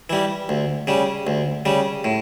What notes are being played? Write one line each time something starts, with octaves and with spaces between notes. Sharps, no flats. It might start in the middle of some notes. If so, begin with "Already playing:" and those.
E3 G3
D2
C#3 G3
D2
C#3 G3
A2